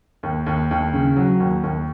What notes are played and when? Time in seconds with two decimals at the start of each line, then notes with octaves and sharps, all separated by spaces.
0.23 D#2
0.46 D#2
0.71 D#2
0.93 C#3
1.17 F#3
1.40 D#2
1.63 D#2